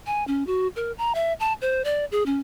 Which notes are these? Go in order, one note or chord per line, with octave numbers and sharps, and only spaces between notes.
G#5
C#4
F#4
A#4
A#5
E5
A5
C5
D5
G#4
C#4